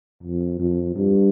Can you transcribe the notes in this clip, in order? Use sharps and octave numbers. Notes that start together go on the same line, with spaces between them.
F2
F2
G2